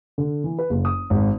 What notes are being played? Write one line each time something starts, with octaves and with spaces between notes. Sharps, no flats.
D3
E3
B4
F#1
D#6
G#1